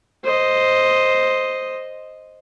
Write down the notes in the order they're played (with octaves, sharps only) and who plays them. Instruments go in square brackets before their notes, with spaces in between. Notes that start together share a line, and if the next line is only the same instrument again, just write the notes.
[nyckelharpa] C5 D#5